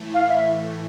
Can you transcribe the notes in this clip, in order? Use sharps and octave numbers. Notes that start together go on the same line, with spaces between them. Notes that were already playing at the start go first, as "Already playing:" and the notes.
Already playing: A2 E3 A3
F5
E5